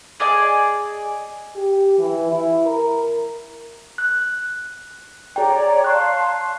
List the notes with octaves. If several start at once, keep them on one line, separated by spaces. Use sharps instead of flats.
G#4 D5 D#5 G#5
G4
E3
E4
A#4
F#6
G#4 C#5 D5 G5 A#5
F5 A5 C6 C#6 F#6